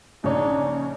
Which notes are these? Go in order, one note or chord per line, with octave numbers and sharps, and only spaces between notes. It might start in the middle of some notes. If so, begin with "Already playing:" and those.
A#1 C#3 D4 D#4 C#5